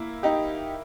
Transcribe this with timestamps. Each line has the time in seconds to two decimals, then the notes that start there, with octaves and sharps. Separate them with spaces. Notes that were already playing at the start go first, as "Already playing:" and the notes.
Already playing: A#3 E4
0.23 D#4 G4